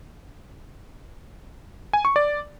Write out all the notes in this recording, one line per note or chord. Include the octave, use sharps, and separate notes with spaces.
G#5
C#6
D5